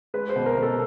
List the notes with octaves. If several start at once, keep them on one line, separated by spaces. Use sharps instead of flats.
G#3 B4
C5
B2
A#4
B2
A4